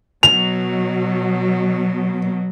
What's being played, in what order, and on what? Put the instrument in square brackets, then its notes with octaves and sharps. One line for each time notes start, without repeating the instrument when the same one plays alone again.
[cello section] B2 F#3 [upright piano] F7